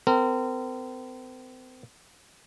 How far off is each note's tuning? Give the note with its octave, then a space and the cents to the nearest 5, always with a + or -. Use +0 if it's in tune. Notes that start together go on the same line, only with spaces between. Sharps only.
C4 -35 A#4 -30